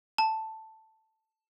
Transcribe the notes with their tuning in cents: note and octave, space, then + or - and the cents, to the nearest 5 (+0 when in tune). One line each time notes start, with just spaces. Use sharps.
A5 +5